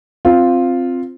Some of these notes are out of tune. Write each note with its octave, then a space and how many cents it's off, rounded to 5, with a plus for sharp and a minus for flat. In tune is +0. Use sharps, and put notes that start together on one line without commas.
C4 +0 F4 +0